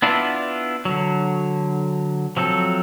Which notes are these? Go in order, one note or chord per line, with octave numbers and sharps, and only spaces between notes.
B3 D4 E4 F4
D3 F#3
F3 F#3 C4 A4